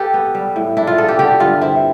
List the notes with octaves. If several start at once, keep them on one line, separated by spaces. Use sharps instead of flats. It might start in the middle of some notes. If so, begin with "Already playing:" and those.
Already playing: G4 A4 B4
B3
G3
A2
D4 E4
F4
B3 A4
G4
D3 G4
G2 F4
C4 E4